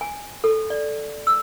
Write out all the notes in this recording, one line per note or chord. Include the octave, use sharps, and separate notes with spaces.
G#5
A4
D5
E6